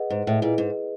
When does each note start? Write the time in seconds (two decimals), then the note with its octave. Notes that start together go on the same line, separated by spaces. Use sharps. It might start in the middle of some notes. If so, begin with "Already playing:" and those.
Already playing: G#4 B4 D#5 F#5
0.10 G#2
0.27 A2
0.42 A#2 G#4 B4 D#5
0.58 G#2